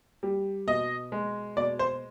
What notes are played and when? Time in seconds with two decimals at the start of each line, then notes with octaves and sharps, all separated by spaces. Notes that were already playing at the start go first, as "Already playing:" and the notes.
0.23 G3
0.67 B2 D#5
1.12 G#3
1.57 B2 D5
1.79 C5